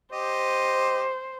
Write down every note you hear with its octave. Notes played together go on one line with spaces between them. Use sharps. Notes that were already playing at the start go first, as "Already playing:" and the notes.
G4 C5 D#5